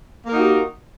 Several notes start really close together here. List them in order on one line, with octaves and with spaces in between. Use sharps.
A#3 A#4 D#4 F#4 G4